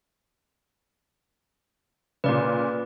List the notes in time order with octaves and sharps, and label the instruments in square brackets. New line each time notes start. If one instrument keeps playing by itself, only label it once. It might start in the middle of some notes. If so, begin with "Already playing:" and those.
[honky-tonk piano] A#2 C#3 [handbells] B4 D5